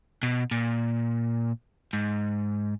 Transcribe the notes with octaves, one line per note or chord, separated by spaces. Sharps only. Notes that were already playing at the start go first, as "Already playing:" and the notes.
B2
A#2
G#2